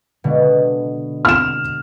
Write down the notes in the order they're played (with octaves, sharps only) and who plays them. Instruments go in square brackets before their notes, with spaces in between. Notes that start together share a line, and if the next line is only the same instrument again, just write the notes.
[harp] B2 D3 G#3
[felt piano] F6 E7